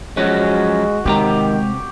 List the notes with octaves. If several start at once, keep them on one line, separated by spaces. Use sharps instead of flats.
F3 F#3 G#3 C#4 F#4
C3 D#3 G#3 G4 B4 A#5